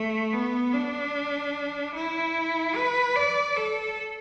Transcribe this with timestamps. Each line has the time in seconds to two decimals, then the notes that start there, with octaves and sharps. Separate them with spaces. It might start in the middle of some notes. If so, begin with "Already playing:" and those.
Already playing: A3
0.33 B3
0.73 D4
1.95 E4
2.76 B4
3.16 D5
3.56 A4